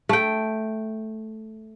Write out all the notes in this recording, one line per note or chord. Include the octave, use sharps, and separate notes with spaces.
A3 G5